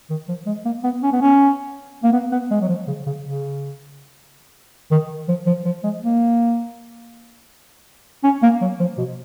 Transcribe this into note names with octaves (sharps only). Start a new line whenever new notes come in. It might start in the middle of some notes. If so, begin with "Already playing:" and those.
D#3
F3
G#3
A#3
B3
C#4
B3
C#4
A#3
B3
B3
G#3
F#3
F3
C#3
C#3
C#3
D#3
F3
F3
F3
G#3
A#3
C#4
A#3
F#3
F3
B2